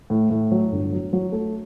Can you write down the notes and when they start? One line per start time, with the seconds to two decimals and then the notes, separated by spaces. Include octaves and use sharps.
0.10 A2
0.30 A2
0.51 F#3
0.72 G1
0.92 F#3
1.13 F#3
1.32 A3